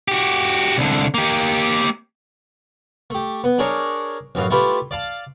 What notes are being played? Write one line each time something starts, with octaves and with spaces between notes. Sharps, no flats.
F#4 G4
C2 D3
A#3 G4
A3 G4
B3
D4 G#4 A#4 C#5
A1 F#2 E3 F5
A3 E4 F4 G4 B4 E5
D5 F5 A5